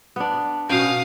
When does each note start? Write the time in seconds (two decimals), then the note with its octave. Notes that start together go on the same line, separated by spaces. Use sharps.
0.16 B3 D4
0.69 B2 C#4 F5 G5 D#6